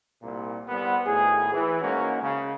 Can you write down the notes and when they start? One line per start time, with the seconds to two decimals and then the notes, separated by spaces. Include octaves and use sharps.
0.23 C2 A#2
0.69 C2 G3 B3
1.06 G#1 A2 G#4
1.53 E3
1.81 G#2 G#3 A#3 C#4 F#4
2.21 C#3